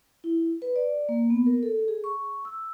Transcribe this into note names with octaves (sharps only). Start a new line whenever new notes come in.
E4
B4
D5
A#3
B3
A#4
A4
G#4
C#6
E6